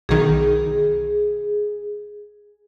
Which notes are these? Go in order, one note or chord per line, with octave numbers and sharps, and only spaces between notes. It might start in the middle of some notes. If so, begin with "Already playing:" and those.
B1 D#3 G#4